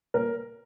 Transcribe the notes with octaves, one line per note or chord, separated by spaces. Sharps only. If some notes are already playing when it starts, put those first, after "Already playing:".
A#2 A#4